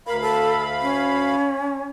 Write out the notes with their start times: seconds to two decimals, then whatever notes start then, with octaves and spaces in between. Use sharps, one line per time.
0.07 D2 A#4 F5 B5
0.21 A4
0.82 C#4